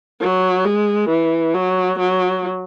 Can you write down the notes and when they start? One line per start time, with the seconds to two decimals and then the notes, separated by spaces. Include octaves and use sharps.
0.20 F#3
0.65 G#3
1.09 E3
1.54 F#3
1.99 F#3